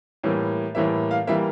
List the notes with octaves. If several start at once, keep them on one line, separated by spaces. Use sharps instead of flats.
A2 E3 G3 A#3
A2 E3 G3 A#3 E5
F5
E3 G3 A#3 E5